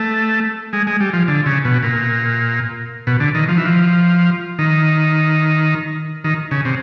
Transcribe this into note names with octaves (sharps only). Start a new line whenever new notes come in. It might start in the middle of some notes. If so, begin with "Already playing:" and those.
Already playing: A3
G#3
G#3
G3
F3
D3
C#3
B2
A#2
B2
D3
D#3
F3
E3
F3
D#3
D#3
C#3
C3